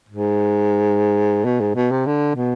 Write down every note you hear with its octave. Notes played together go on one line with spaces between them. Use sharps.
G#2
B2
G#2
B2
C3
D3
B2